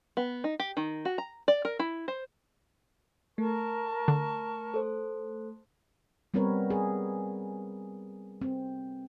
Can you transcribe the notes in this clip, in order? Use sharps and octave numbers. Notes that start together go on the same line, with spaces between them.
B3
D#4
G4
D#3
F#4
A#5
D5
A#4
E4
C5
A3 A#4 A5 C#6
D3
A4 C5
G3 B3 C4 A#4 B4 C#5
G#4
C4